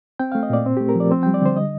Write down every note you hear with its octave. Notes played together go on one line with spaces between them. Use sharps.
C4 G5
A3 F5
D#5
A#2 D5
C4
A3 G4
A#4
F3 D5
C4 C5
G3 G5
D5
D3 C5
D#5